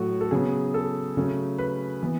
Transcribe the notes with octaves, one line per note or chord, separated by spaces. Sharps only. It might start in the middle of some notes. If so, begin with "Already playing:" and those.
Already playing: A2 F#3 A3 F#4
A4
C#3 F#3 B3 G#4
A4
C#3 F#3 A3
B4
E3 B3